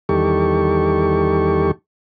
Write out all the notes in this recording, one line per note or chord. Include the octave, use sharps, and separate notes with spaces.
E2 D#3 G3 G4 A4 C#6